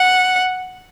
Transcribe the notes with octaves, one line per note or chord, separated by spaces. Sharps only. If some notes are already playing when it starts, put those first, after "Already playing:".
Already playing: F#5